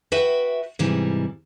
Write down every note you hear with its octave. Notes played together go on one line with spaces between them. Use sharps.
F#4 B4 E5 G5
G#2 C3 E3 G3